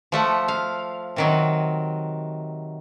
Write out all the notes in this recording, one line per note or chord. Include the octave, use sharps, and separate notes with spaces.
F3 A3 F#5
F5
C3 D#3 F#3